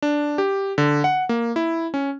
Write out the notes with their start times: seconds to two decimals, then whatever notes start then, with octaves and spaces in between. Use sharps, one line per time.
0.02 D4
0.38 G4
0.78 D3
1.04 F#5
1.29 A#3
1.56 E4
1.94 C#4